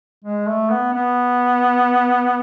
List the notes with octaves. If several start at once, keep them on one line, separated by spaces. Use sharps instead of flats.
G#3
A3
B3
B3